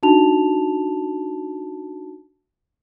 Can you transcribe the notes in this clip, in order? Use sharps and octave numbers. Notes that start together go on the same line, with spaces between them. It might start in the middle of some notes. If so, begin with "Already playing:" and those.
D4 D#4 F#4 A5 F7